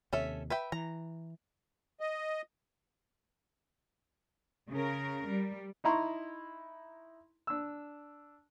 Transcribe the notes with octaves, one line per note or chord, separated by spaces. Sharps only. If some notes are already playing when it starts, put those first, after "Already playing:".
D#2 C3 C#4 A4 E5
B4 E5 G5
E3 A#5
D#5
C#3 A#4
G3
D#4 E4 A#5 C6 C#6
D4 E6